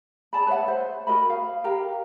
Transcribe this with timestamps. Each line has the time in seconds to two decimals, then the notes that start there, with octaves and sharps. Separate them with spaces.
0.33 G#4 D5 A5 B5
0.47 B4 C#5 E5 F#5
0.68 C5
1.07 F#4 A#4 D#5 B5
1.30 F5
1.64 G4 A#4 F5 A#5